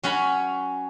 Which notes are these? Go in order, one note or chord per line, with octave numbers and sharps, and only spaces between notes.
F#3 C#4 F#5 B5